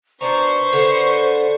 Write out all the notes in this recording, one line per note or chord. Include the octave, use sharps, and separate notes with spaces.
B2 D4 B4 C5 A#5 C#6
D3